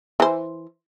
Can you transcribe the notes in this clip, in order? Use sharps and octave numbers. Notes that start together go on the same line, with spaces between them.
E3 C5